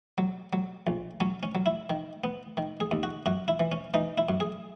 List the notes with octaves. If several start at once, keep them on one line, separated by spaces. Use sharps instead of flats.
F#3
F#3
A#1
F#3 C#4
C#4
F#3
E4
D#3
B3
D#3
G#4
D#2
F#4
F#2 F#4
E4
E3
C#4
E3 D#4
E4
F#2
G#4